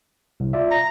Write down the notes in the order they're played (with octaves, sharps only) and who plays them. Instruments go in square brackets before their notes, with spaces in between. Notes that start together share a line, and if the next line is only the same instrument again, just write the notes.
[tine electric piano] C2
F4 D5 E5
[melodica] A#5